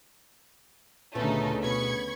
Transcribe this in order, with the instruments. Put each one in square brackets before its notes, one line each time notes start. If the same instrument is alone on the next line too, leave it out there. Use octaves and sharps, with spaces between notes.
[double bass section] D2 C#3 [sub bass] A#2 [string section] A3 D#4 [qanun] B3 C#4
[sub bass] B2 [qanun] B3 [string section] B5 C#6 G#6